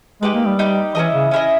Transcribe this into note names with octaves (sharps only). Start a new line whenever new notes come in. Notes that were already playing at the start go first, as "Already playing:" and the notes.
G#3 D#4 G4 B4
A#3
G3
D#4 G4 B4
E3 C#4 E4 A#4 D#5
C#3
C#4 E4 A#4 D#5